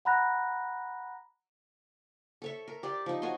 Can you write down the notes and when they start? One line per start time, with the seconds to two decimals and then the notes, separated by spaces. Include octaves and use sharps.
0.05 F#5 A#5 B5 F#6 A#6
2.42 A4 C#5 E5
2.68 A#4
2.83 G4 D5 C6
3.06 F3 D#4
3.22 F#4 C#5 D#5 C6